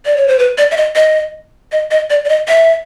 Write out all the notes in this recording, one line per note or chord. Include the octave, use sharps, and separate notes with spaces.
D5
C#5
C5
B4
D5
E5
D#5
D#5
D#5
D#5
D5
D5
D#5
E5